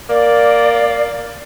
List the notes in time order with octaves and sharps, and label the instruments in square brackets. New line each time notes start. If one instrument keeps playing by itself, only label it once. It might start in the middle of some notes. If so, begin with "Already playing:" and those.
[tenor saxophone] A#3 [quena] D5